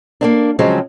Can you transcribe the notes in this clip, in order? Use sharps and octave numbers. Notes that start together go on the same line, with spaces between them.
A#3 C4 D4
C#3 F3 F#3 G#3 C4